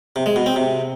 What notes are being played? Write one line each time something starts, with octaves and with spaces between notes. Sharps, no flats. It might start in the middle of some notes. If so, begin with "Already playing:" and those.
C3
G#3
B2
C4
C3